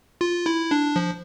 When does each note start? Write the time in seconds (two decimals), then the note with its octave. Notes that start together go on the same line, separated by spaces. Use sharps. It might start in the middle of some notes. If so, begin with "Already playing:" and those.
0.21 F4
0.46 E4
0.71 D4
0.96 F3